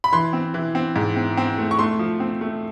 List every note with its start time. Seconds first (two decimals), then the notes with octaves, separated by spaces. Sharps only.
0.04 B5
0.12 E3 C6
0.33 C4
0.54 E3
0.75 C4
0.96 G#2
1.16 C4
1.37 C4
1.58 A3
1.71 C#6
1.79 A3 C6
1.99 F3
2.20 C4
2.41 A3